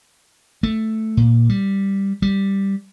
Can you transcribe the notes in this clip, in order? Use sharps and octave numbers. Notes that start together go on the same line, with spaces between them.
A3
A#2
G3
G3